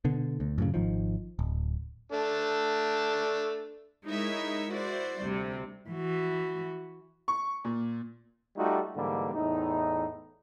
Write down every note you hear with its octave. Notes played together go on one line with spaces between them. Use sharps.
B2 D3
D2
F#2 A2 C#3
G#1 D#3 F3
D1
A3 D4
G#3 D#4 E4 A#4 C#5 E5
E4 F#4 C5 D5
D2 C3 G3
E3 F#4
C#6
A#2
G3 A3 D#4 F4 F#4
G#2 D3 E3 G3 A#3
E2 A2 D#4